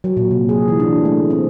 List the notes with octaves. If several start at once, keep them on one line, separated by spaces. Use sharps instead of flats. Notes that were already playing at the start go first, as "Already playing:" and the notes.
F#3
A#2
C3
G#4
E3
D4
A3
C4